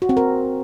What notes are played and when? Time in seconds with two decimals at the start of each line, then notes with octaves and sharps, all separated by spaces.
0.02 F#4
0.09 C4
0.17 A#4